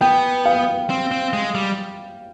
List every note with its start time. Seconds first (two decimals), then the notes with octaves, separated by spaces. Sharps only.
0.01 B3 G5
0.45 F5
0.90 C4
1.11 C4
1.33 G#3
1.55 G3